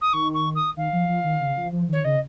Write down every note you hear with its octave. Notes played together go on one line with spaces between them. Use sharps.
D#6
D#3 C#6
C#6
D#6
D#3 F5
F3
F3
D#3
C#3
F3
F3
D#3 C#5
C#3 D#5